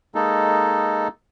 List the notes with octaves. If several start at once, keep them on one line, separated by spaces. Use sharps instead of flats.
G#3 A#3 D#4 A4